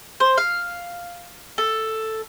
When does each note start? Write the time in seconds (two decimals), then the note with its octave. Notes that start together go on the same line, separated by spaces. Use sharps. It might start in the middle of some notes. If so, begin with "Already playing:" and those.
0.20 C5
0.38 F5
1.58 A4